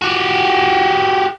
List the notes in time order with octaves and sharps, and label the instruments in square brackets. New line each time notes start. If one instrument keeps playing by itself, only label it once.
[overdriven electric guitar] F#4 G4